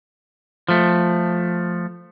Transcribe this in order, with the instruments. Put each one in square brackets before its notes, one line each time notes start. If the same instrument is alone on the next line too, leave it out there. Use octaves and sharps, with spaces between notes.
[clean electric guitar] F3 A3